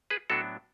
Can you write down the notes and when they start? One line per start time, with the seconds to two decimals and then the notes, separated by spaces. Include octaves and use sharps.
0.10 G#4 B4
0.30 A2 F#3 B3 D4 F#4 A4